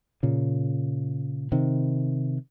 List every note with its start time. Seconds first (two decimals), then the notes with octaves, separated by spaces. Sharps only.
0.23 A#2 C#3
1.52 C3 D#3